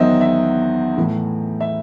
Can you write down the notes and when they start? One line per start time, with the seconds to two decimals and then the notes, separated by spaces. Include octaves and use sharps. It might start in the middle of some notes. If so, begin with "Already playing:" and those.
Already playing: E2 D#3 F#3 C5 D#5 E5
0.21 E5
0.97 A2 E3
1.61 E5